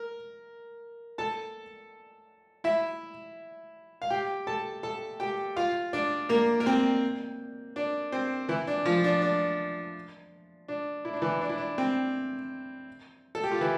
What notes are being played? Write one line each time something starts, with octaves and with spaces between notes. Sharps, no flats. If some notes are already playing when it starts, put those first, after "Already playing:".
Already playing: A#4
A4 A5
E4 E5
F5
G4 G5
A4 A5
A4 A5
G4 G5
F4 F5
D4 D5
A#3 A#4
A#4
C4 C5
D4 D5
C4 C5
E3 E4
D4
F3 F4
D4
D4
D4
E4
D4
E3 E4
D4
E4
D4
C4
A4
G4
F4
E3 E4